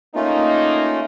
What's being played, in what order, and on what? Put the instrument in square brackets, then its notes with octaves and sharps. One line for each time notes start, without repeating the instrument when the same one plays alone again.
[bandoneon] A3 C#4 F4 [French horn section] A#3 D#4